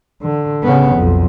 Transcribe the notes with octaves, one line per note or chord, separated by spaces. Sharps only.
D3
C#3 B3
B1 F2